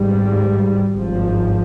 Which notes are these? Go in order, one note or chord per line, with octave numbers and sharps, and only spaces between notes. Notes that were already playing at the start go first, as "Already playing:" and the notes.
Already playing: G#1 G#2 G3
G#1 G2 F3